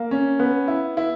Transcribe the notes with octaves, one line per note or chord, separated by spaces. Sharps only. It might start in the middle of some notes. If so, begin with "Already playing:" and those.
Already playing: A#3
C#4
B3
E4
E4